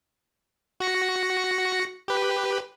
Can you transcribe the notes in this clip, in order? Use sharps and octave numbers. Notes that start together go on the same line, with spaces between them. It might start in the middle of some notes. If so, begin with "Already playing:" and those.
F#4 A#6 C#7
G4 B4